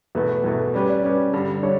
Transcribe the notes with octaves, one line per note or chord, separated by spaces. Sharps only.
E2 B2 A3 B4
E2 B2 A3
G3 C#4 G4 B4 D5
D5
G3 C#4 G4 B4
G2 D3 G3 D4
D3 G3 D4 C#5